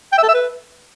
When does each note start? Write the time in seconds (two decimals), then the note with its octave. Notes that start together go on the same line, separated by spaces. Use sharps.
0.12 G5
0.18 E5
0.23 A4
0.29 E5
0.34 B4